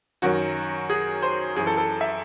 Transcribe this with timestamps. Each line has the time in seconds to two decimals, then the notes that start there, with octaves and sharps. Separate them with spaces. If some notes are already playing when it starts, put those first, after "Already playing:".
0.22 F#2 D#3 F#3 F#4
0.90 G#4
1.23 C5
1.56 F#2 G#4
1.59 E3
1.67 A4
1.78 A4
2.01 E5